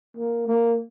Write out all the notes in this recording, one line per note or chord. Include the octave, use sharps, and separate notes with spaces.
A#3
A#3